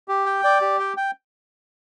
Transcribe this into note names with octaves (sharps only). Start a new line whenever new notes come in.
G4
G5
D5
G4
G5
G5